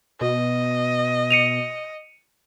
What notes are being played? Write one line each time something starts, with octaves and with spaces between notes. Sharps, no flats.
B2 D#5
C#7 D#7 F7